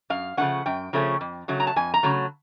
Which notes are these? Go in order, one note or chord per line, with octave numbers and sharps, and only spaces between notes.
F#2 F5
C#3 F3 A3 C#4 F#5
F#2 G5
C#3 F3 A3 C#4
F2
C#3 F#3 A3
A#5
A5
F2 G#5
A#5
C#3 F#3 A3